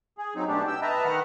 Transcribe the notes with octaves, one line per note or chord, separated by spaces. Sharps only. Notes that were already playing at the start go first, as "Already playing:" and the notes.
G#4
F#3 C4 D#4
B2 A3 D4 G4
G5 E6
B4 D#5 E5 A5 A#5
D#3 B4 F#5 F6